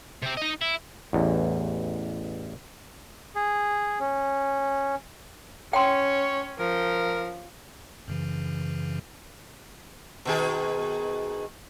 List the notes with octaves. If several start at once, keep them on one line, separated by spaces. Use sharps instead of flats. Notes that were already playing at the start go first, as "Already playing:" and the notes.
C3 C4
D#4 D#5
E4
A1 E2
G#4
C#4
C#4 C#5 G5 C6
F3 A#4
F#2 C#3 E3
B2 D#3 G#4